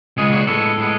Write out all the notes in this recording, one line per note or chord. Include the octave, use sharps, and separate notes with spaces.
C#2 C#3 G#3 B3 G#4
F#4
A2 G#3 B3 A4
A2 G#3 B3